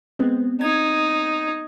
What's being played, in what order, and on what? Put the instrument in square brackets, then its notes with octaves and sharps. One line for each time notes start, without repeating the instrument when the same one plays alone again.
[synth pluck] G#3 B3 C4
[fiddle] D#4 [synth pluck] G#6